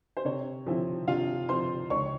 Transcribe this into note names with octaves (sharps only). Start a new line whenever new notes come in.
C5
C3 C#5
F3 C4 E4
C3 F4 F5
F3 C4 E4 C5 C6
C#2 C#5 C#6